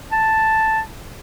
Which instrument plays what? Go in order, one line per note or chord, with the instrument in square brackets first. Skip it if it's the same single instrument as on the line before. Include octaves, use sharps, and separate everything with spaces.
[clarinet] A5